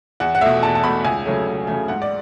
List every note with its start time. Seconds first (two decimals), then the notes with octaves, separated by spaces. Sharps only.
0.20 E2 F#5
0.35 F#5
0.41 B2 A3 E5
0.63 E2 A5
0.75 A5
0.84 B2 A3 B5
1.04 C#2 G#5
1.26 C#3 F#3 A3
1.47 C#2
1.67 C#3 F#3 A3
1.88 G#2 F#5
2.02 D5